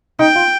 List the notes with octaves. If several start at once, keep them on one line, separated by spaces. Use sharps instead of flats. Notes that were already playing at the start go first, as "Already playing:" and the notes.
D#4 G5
F4